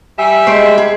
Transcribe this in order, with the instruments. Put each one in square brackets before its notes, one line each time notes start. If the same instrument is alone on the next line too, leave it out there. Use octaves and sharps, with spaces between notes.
[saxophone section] G3 E5 [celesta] G#5 E6
[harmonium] G#3 [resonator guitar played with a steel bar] A3 C5 [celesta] C7 D7
[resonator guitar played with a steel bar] G#4